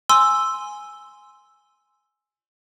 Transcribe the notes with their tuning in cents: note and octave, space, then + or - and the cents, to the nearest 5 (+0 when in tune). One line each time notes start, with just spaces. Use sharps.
G#5 +0 C6 +0 E6 +0